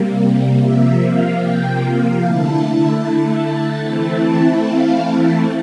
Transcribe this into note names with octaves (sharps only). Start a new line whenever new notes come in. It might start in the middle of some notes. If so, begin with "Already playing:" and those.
Already playing: C3 G3 A#3
C3 F3 A#3 E5
F5
G5
F5
D3 A3 E4 A5
E3 A3 C4 E4 A5
F5
A5